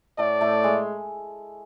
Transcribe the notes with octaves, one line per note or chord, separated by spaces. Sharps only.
A2 A3 D5
A2 A3
G#3